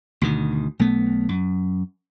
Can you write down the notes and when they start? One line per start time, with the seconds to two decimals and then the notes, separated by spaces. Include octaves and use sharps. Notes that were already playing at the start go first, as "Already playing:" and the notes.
0.21 D2 B2 D#3
0.79 B1 A3 B3
1.29 F#2